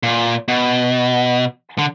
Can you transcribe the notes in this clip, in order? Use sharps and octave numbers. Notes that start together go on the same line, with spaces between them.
A#2
B2
D3